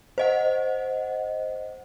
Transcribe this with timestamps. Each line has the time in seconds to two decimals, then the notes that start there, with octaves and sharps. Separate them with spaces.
0.18 C5 D#5 F#5